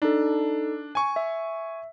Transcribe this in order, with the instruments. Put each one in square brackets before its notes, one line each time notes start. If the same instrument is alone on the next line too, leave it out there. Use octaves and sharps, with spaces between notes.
[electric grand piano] D4 [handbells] D#4 A4
[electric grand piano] G#5 C#6
[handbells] E5